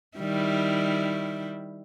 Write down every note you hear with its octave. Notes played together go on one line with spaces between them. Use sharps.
D#3 G3 E4